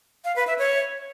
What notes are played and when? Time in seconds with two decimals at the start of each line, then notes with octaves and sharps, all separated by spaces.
0.25 F5
0.36 B4
0.47 E5
0.58 C#5